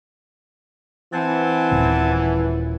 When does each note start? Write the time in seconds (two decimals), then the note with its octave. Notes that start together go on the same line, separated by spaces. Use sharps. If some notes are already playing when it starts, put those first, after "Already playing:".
1.13 E3 C4 F#5 G#5 A5
1.71 D#1